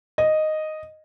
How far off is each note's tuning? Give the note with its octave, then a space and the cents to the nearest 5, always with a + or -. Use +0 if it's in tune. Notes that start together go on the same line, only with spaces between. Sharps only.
D#5 -5